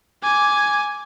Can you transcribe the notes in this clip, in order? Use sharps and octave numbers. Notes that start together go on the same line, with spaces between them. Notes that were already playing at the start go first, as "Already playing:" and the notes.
G#5 D6